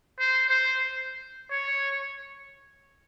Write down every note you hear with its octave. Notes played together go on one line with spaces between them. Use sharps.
C5
C5
C#5